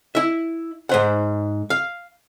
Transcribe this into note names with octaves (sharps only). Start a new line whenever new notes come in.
E4 E5
G#2 C5 F#5
F5